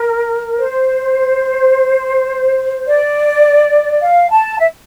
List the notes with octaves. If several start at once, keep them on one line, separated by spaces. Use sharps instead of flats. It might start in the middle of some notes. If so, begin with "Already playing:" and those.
Already playing: A#4
C5
D5
F5
A5
E5